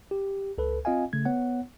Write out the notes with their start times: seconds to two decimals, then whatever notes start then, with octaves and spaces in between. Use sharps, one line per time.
0.11 G4
0.58 C#2 A4 B4
0.85 C4 F4 D#5 F5 G#5
1.13 C#3 A3 G#6
1.25 B3 C#5 F#5